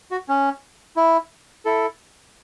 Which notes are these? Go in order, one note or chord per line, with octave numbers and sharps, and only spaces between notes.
F#4
C#4
E4
E4 A4